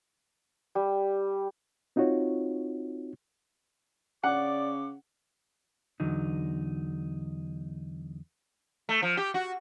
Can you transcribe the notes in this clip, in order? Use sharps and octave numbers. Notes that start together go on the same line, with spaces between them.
G3
C4 D#4 F4 F#4 C#5
C#3 D5 F#5 D6
E2 D3 F#3 D#4
A3
F3
G4
F#4